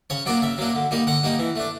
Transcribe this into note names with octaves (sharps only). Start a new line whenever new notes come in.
C#3 C#5
F#3 A#3 D4 D5
C#3 E5
F#3 A#3 D4
D3
G3 A#3 D#4
D3 F#5
G3 A#3 D#4
E3
A3 D4